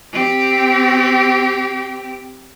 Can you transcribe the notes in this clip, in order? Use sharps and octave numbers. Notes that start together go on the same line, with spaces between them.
C4 G4